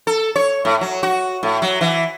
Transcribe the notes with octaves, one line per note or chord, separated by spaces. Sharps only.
A4
C#5
A2
F#3
F#4
A2
F#3
E3